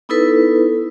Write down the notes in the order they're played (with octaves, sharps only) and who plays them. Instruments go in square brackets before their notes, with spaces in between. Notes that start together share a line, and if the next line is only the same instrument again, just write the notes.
[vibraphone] B3 D#4 E4 A4 B4